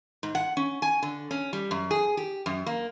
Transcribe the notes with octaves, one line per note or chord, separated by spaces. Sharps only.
G#2
F#5
C#4
G#5
D3
C#4
G3
F#2
G#4
G4
F#2
A#3